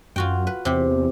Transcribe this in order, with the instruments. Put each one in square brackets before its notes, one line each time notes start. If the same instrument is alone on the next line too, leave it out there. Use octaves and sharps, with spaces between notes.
[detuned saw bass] F#2 [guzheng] F4 F#4 G5
[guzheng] B4
[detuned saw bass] E2 [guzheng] C3 G4